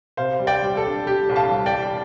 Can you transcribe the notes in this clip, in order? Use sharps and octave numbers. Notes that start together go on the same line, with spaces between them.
C3 C5 F5
G3
D5 G5
G3
A4
D4
G3 G4
C2
F5 A5
C2
D5 G5
G3